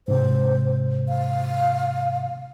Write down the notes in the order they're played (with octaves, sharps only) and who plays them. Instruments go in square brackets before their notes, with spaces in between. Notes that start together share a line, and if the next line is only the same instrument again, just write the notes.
[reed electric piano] G#2 C3 [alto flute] C5
[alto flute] F5